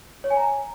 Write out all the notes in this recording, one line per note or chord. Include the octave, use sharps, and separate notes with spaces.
C#5
G#5
A#5